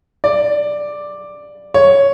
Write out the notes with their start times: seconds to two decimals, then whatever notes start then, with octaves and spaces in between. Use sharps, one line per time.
0.24 D5
1.74 C#5